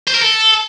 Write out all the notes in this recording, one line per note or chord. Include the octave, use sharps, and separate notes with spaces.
C5
A#4
A4